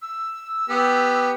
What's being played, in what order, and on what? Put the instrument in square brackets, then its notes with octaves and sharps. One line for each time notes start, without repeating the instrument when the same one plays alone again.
[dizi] E6
[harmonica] B3 G4